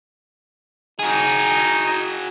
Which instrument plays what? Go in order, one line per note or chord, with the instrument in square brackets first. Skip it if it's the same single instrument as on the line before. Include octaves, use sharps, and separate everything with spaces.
[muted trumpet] D#4 [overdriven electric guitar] F#4 G#4